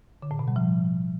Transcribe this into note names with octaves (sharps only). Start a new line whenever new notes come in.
D3
A2
B2
G3
F3